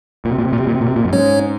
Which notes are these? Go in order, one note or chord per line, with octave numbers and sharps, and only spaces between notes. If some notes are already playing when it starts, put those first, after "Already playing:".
A#2
C3
A#2
C3
A#2
C3
A#2
C3
A#2
C3
A#2
F#2
G#2 C#4 C#5